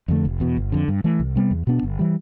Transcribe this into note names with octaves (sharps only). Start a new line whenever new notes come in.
F2 D3 A3
F1
E2 B2
G1
F2 D3
G2
E3 A3
C2
C3 G3 B3
E2
B2 B3 D4
G1
E3 G3